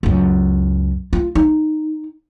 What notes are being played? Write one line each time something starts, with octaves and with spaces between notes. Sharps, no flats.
C#2 F#2
F4
D#4